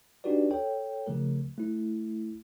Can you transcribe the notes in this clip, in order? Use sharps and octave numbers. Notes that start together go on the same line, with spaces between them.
D4 D#4 F#4 G4 B4 D5
A4 C#5 G5
C#3 F3 A3 A#4
A3 E4